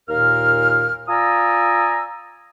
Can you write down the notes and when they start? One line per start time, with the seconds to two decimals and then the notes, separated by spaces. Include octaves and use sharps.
0.09 D#2 A#2 A#4 F5 F6
1.08 F4 D5 G#5 A#5 D#6 E6